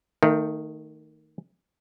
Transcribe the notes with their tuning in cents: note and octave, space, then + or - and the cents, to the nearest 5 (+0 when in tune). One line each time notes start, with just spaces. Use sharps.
D#3 +0 A3 +35